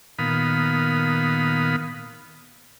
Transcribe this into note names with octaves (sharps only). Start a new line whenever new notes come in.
A#2 D#3 B3 F5 B5 D#6